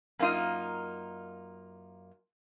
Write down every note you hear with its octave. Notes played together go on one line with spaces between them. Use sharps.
F#2 A#3 D#4 F4 D#5